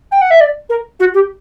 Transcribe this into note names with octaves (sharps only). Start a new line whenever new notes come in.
G5
F#5
E5
D5
A#4
F#4
G4